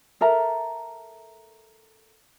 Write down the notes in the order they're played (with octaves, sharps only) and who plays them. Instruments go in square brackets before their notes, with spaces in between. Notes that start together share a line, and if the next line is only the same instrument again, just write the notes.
[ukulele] A4 A#4 E5 A#5